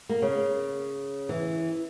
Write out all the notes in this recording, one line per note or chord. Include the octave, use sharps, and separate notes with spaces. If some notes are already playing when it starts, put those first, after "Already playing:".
A#3
C#3
E3